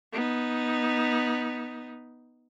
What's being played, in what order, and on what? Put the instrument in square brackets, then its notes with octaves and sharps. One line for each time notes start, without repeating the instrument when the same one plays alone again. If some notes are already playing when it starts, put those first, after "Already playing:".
[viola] B3 D#4